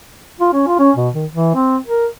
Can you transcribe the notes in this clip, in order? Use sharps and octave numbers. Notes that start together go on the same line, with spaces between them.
F4
C#4
F4
C#4
B2
D#3
E3
C4
A#4